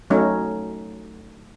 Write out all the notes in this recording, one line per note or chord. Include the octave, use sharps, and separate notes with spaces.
F#3 A3 C#4 D#4